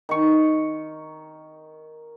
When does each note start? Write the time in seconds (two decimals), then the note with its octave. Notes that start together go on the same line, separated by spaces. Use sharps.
0.09 D#3 C#6